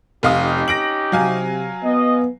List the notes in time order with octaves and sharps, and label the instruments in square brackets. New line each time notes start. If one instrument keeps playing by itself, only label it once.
[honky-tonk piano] F1 F5 D#6 [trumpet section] C#4 D#4 G4
[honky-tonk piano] A#6 D7 F#7
[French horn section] C3 [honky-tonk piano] F#3 F5 G#5
[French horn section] B3 B4 [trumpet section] D#5